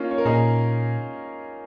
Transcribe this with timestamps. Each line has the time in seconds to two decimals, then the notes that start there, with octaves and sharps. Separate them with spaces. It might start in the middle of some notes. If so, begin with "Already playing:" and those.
Already playing: A#3 C#4 D#4 F4
0.11 C#5
0.18 A#4
0.25 A#2 D#4 G#4